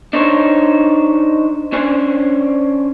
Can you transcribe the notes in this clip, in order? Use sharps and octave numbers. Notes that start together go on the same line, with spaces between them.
D4 D#4 C5 C#5
C#4 D4 C5 G#5